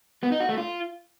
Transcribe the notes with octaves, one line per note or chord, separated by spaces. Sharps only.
B3
D#4
F#4
A3
F4